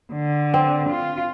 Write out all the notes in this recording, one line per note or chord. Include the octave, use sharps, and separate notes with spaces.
D3
C4
F4